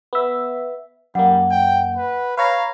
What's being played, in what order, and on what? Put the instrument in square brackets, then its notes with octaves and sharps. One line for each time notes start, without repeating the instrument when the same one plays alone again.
[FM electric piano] B3 E5
[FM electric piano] F#2 A#3 [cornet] G3 [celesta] F#5
[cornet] G5
B4
[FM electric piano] B4 C#5 A#5 [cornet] F5